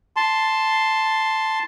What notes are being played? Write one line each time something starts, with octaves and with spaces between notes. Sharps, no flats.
A5 C6